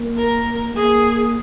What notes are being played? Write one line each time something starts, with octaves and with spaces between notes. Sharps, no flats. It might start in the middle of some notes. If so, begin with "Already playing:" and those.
Already playing: A#3
A#4
A#3 G#4